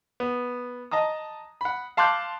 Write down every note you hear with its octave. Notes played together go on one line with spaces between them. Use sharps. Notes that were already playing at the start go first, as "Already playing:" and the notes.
B3
D#5 A5 A#5 D#6
F#5 B5
F5 A5 C6 D6 F#6 G6